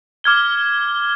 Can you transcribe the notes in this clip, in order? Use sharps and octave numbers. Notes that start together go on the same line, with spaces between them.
D6 F6 G#6 G7